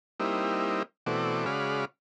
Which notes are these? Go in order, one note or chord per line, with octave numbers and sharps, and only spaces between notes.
G3 A#3 C4 D#4 E4
B2 E3 A3 C4 F#4 D5
C#3 G#3 F#4 D5 F5 B5